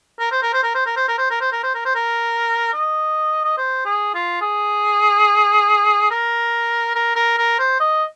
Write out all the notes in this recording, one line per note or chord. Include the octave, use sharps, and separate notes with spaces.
A#4
C5
A#4
C5
A#4
C5
A#4
C5
A#4
C5
A#4
C5
A#4
C5
A#4
C5
A#4
D#5
D#5
C5
G#4
F4
G#4
A#4
A#4
A#4
A#4
C5
D#5